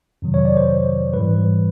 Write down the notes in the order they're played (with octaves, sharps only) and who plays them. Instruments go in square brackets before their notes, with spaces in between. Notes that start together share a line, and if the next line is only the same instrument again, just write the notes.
[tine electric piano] F2 C3 D#3 F#3
C#5
D5
C5
G#2 E3 G3 B4